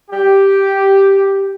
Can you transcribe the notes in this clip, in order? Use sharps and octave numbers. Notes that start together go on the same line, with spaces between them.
G4